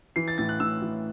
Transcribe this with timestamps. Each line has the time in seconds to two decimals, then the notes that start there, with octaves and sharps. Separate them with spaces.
0.16 E3 C7
0.28 A6
0.38 A2 A6
0.49 F#6
0.60 A2 E6
0.82 E3